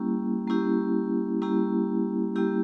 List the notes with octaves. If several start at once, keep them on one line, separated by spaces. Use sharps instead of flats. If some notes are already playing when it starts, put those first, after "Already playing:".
Already playing: G3 A#3 C#4 E4 G4
G3 A#3 C#4 E4 G4
G3 A#3 C#4 E4 G4
G3 A#3 C#4 E4 G4